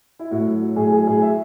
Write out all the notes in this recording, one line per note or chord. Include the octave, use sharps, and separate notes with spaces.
E4
A2 F#4
F#3
F#3
A2 G#4
F#3 G#4
A2 G#4
E5